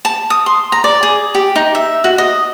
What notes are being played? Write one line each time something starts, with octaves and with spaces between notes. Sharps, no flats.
A5
D#6
C6
A#5
D5
G#4
G4
D#4
E5
F#4
D#5